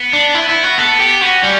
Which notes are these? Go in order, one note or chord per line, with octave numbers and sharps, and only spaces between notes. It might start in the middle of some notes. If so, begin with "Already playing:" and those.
Already playing: B3
D4
E4
E4
F#4
B3 A4
G4
C#4 F#4
G3